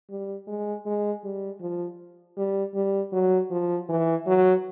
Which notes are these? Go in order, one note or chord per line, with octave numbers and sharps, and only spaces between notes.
G3
G#3
G#3
G3
F3
G3
G3
F#3
F3
E3
F#3